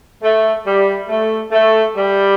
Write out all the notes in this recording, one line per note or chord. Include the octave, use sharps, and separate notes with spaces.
A3
G3
A3
A3
G3